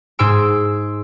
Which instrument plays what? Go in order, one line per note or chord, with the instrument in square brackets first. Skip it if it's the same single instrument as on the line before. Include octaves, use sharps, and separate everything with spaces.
[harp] G#2 G#4 C6 E6 D7